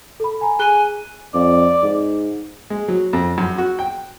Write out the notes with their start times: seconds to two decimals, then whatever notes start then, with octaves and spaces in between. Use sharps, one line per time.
0.20 A4 B5
0.41 G#5 A#5
0.59 G#4 G#5 F#6 G7
1.34 F2 D5
1.83 G#2
2.70 G#3
2.88 F#3
3.13 F2
3.38 F#2
3.58 F#4
3.79 G5